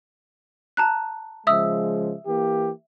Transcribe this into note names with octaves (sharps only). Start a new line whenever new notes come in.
A5 A#5 F#6
C#3 F3 G#3 E5 D#6 E6
E3 A#3 G4